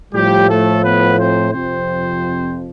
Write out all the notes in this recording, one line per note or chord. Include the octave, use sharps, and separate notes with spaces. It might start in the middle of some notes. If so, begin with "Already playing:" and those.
A2 F3 G3 G4
A3 A4
B3 B4
C4 C5
F2 C3 F3 C4 C5